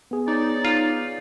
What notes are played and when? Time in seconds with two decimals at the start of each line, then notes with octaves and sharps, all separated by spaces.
0.11 B3 G#4
0.28 D#4 C#5 D5
0.65 F4